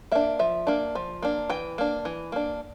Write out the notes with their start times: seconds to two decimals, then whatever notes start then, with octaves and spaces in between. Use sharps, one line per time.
0.12 A#3 D4 E5
0.39 F3 E5
0.67 A#3 D4
0.95 F3
1.22 A#3 D4
1.50 E3 G5
1.78 A#3 D4
2.05 E3
2.32 A#3 D4